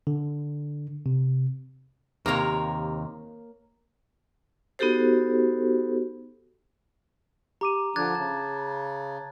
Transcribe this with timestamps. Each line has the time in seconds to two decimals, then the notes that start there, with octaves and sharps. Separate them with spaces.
0.07 D3
1.06 C3
2.26 D#2 C3 A#3 A#4 C#5
4.79 B3 D#4 F#4 G4 A4 C5
7.61 G4 A#5 D6 D#7
7.96 D3 F3 D4 D6 F#6 G#6 A6
8.15 C#3 A5